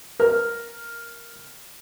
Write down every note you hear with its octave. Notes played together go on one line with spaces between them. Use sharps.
A#4 F6